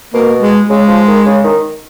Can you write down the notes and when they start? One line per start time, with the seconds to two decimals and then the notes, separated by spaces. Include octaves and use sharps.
0.13 B2 A#3
0.42 G#3
0.70 C#3 G#3
0.88 F3
1.07 D#3
1.26 C#3
1.44 D#3